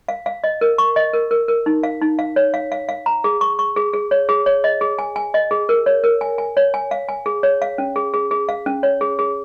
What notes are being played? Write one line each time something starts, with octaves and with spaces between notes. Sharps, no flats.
F5
F5
D#5
A#4
C#6
D#5
A#4
A#4
A#4
D#4
F5
D#4
F5
C#5
F5
F5
F5
A#5
G#4
C#6
C#6
G#4
G#4
C#5
G#4
C#5
D#5
G#4
G#5
G#5
D#5
G#4
A#4
C#5
A#4
G#5
G#5
C#5
G#5
F5
G#5
G#4
C#5
F5
C#4
G#4
G#4
G#4
F5
C#4
C#5
G#4
G#4